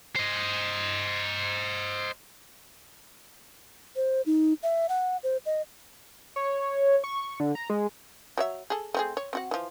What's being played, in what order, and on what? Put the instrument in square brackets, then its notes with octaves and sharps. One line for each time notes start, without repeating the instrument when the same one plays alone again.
[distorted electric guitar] C5 D#5
[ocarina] C5
D#4
E5
F#5
C5
D#5
[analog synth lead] C#5
C#6
D3
A#5
G#3
[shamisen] F#3 C#5 E5
G#4 A4
A3 C4 G#4
C#5
C4 F#4 F#5
E3 F3